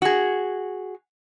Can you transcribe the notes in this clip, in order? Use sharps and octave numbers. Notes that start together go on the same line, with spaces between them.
F#4 G#4